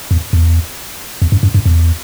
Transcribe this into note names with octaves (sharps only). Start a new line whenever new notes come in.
E2
E2
E2
F#2
F#2
F#2
E2